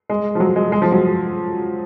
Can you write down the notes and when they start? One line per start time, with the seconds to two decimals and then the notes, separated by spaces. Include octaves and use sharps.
0.10 G#3
0.35 F3
0.40 F#3
0.56 G#3
0.72 G#3
0.82 F3
0.92 F#3